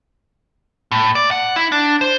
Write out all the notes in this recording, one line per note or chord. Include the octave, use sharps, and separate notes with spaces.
A2
D5
F#5
E4
D4
C5